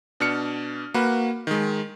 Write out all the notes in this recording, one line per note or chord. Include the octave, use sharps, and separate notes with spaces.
B2 D4 F6 C#7
A#3 F#4 B4
D#3 G#3